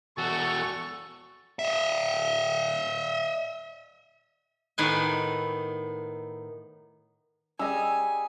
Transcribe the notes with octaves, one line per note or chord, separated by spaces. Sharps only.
E2 F#4 A4 C#6
D#5 E5
A2 D#3 B3 G#5
G3 C#4 G#4 D#5 G#5 E6